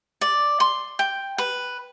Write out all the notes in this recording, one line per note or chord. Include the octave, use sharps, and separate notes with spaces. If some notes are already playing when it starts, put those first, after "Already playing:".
D5
C6
G5
B4